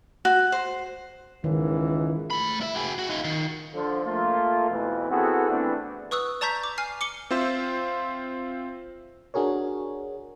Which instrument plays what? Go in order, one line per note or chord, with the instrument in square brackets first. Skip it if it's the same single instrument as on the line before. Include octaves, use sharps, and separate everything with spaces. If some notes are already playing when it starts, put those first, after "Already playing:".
[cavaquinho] F#4
C5
[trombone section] C#2 G#2 E3 [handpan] D#3
[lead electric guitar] A3 B5
E4 E5
F#4 G#4
F#4
D#4 F4
D#3
[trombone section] D3 F3
A3 A#3 F4
F2 B2 E3
B3 C4 E4 F#4 G#4 A4
E3 A3 B3 C4 D4
[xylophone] B4 C#6 D#6 E6 F#6
D5 A5 A#5 C#6 G6 B6
D6
G#5 F6 C7
D6 C#7 G7
[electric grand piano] C4 F4 C5 E5
[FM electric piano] D4 F#4 G#4 A#4 C#5